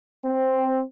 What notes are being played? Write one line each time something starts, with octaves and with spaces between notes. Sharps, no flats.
C4